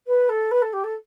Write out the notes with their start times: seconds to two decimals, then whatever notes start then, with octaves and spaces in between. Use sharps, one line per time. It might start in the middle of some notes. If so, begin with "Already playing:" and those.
0.07 B4
0.29 A4
0.51 B4
0.62 A4
0.73 G4
0.84 A4